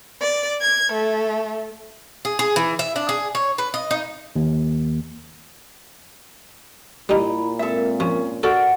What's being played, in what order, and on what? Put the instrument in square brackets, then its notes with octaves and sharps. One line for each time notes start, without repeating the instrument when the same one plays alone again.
[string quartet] D5
G#6
A3
[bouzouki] G#4
G#4
E3
E5
D4
G#4
C#5
B4
D#5
D#4
[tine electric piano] D#2
[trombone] A#2 [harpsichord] G3 D#4 [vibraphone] E4 A#5 B5
[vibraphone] G#3 C4 A#4 [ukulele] A4 E5
[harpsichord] F3 [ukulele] C#4
[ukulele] F#4 A#4 D5 [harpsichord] A4 [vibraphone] F#5